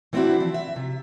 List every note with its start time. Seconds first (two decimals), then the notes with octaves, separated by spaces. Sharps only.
0.13 E3 B3 C4 D4 E4 F#4
0.40 F3
0.54 E5
0.76 C3